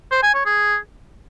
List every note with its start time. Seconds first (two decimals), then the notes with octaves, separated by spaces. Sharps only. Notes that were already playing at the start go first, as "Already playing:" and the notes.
0.11 C5
0.23 G#5
0.34 C#5
0.46 G#4